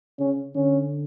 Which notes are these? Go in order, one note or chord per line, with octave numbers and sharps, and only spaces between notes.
C#3 C#4
D3 C#4